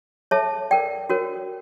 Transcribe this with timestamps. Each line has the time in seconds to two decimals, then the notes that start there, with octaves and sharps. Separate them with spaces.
0.31 A4 C#5 E5 A5
0.71 A#4 D5 G5
1.10 F#4 A#4 C#5